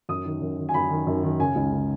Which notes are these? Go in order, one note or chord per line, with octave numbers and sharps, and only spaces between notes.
F#2 D#6
D#3
F#2
D#3
G#5
F#2 B5
D#3
F#2
D#3
C#3 G#5
C#2
C#3